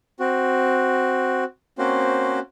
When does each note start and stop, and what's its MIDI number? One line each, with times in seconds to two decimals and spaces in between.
0.20 1.44 60
0.20 1.44 66
1.78 2.39 58
1.78 2.39 60
1.78 2.39 61
1.78 2.39 66
1.78 2.39 72